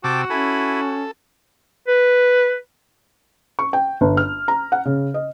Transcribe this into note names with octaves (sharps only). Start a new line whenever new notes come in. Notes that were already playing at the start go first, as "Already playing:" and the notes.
C3 F#4 G5 A5 D6 E6
C#4 E4 A4 G#5 B5
B4
C#6
G5
G1
F6
A#5
F#5
C#3
D#5